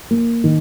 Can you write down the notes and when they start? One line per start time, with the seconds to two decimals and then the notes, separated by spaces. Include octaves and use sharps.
0.11 A#3
0.44 D#3